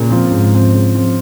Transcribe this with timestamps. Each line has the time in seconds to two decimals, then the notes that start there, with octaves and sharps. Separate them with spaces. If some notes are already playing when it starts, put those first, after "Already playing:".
Already playing: A#2 C#3
0.09 F3 C4 F4
0.30 G#2 C#3
0.51 F3 C4 F4
0.73 C#3
0.95 F3 C4 F4